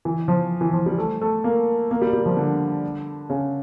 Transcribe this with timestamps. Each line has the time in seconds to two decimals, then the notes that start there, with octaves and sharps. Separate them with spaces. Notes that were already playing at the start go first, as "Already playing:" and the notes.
0.05 E3
0.28 F3
0.61 E3
0.73 F3
0.86 G3
0.98 A3
1.21 A3
1.44 A#3
1.91 A#3
2.01 G3
2.13 G3
2.26 F3
2.37 D3
3.30 C#3